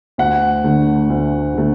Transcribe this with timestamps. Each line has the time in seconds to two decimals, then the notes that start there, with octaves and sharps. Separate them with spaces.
0.18 D2 F#5
0.64 D3 A3
1.10 D2
1.54 D3 A3